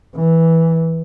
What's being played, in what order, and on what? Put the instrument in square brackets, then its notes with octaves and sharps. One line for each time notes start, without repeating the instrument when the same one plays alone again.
[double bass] E3